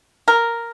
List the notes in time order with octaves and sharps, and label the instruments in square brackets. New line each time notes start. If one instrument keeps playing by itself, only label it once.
[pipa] A#4